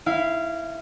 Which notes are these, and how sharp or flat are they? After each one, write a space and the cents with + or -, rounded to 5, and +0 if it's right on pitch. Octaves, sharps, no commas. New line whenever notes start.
E4 +0 F5 -20